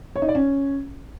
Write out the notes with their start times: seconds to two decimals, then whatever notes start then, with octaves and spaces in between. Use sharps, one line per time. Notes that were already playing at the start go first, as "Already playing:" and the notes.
0.16 C#5
0.22 D#4
0.28 D5
0.35 C#4